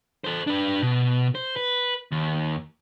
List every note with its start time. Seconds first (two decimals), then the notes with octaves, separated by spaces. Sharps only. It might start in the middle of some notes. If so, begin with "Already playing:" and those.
0.24 A4 C5
0.47 D4 B4
0.82 B2
1.35 C5
1.56 B4
2.12 D#2